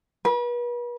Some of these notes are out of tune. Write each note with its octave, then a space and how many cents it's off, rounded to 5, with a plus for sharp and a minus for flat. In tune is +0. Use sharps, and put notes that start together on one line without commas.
B4 -40